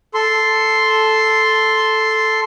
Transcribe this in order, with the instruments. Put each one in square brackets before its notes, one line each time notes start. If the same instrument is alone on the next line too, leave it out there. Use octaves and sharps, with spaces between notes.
[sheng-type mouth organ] A4 C6